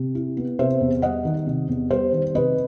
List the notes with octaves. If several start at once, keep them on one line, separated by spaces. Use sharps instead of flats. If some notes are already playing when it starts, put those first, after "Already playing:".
Already playing: C3
E4
B3
C3 C5 E5
E2
G3 D#5 F#5
D#3
C3
E2
G3 C5
D#3
C3 B4 D#5